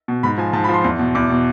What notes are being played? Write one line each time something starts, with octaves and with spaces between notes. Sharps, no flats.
B2
G#2 B5
F3 G#5
G#2 A5
B5
F3
C6
E2
B2
E2 D6
B2